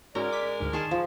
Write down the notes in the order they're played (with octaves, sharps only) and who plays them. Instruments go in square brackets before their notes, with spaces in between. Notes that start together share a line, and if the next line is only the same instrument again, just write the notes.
[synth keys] G#2 C#4 F#4 [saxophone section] G#3 A#4 [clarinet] D5 [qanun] A#5
[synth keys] D6 B6
D2 G#2
[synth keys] D#3 [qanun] G#4 C6 C#6 [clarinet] A5
[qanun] F3